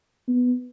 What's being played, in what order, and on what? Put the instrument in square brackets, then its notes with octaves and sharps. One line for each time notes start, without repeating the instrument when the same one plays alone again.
[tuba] B3